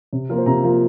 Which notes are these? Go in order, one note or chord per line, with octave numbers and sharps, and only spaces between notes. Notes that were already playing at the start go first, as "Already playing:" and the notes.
C3
F3 A#3 F4 A#4
C5
C3 A#5
F3 A#3 F4